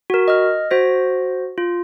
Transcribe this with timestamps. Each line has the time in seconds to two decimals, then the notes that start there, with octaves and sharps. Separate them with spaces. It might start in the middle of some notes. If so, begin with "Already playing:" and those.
0.10 F#4 A#4
0.28 D#5 F6
0.71 F#4 C5 A#6
1.58 F4